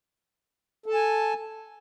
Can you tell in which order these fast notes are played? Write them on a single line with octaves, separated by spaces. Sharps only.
A4 A5 G#5